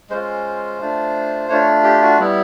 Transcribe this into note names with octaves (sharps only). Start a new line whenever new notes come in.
G#3 C#4 F4 C5
A3 D4 F4
A3 D4 F4 C#5
G4
F#4
G3 B3 E4